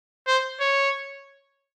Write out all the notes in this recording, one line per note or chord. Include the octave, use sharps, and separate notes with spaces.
C5
C#5